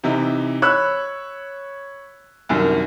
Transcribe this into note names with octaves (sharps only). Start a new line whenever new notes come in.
C3 E3 D#4 E4
C#5 B5 E6 F#6
C2 F#2 D#3